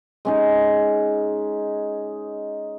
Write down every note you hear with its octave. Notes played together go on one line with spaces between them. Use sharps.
G#3 C#4 D#4